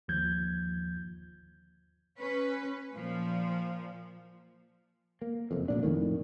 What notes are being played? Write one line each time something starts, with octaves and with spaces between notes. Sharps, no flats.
G1 D#2 F3 G6 G#6
C#4 B4
A#2 F3
A#3
F#1 F2
D2 A#2 D4
F2 A2 D#3